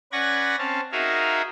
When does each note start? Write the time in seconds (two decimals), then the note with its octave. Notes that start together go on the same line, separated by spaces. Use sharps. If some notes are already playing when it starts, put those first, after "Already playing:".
0.12 C#4 B4 D5 F#5 G#6 A#6
0.59 C4 C#4 F5 A5
0.92 D#4 F#4 G#4 A#4 E5 F5